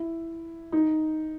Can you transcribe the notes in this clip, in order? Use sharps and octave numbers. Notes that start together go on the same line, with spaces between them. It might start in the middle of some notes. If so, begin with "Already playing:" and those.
Already playing: E4
D#4